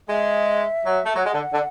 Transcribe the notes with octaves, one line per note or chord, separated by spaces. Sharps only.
G#3 E5
F#3
A3
F#3
G#3 F#5
D3
D3